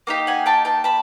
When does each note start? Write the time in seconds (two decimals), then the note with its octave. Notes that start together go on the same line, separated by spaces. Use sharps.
0.07 A#3 D#4 G4
0.27 F#5 G#5
0.46 G5 A5
0.65 G5 A5
0.84 A5 B5